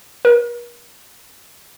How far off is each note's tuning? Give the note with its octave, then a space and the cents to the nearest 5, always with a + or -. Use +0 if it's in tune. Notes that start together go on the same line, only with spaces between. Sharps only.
A#4 +45